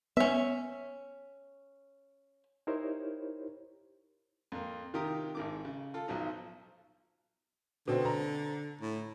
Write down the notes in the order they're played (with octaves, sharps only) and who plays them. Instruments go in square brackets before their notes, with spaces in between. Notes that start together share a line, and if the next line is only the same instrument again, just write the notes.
[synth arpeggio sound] B3 [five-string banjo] C#4 E5
[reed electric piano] D#4 E4 G4 A#4 C5 C#5
[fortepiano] F2 A#3
C3 D#3 F4 G4 A#4 D#6
G#1 D#3 D6
C#3
F4 A4
B1 F3 F#3 D#4
[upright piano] B2 C4 [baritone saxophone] D3
[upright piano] A#5
[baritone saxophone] A2